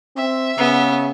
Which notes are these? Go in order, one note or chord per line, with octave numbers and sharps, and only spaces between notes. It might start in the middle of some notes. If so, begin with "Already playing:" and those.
C4 E5
C#3 B3